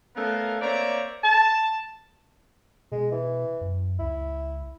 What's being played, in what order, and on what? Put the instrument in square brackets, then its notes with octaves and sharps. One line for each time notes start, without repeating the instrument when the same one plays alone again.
[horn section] A3 B3 C#4 A4 A#4 F5
A#3 C4 C#5 D5 E5 A#5
A5
[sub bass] B2 [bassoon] G#3
[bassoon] E3
[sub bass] F#2
[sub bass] C#2 [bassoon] E4